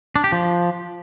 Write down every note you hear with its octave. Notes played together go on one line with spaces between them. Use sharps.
D4
G4
F3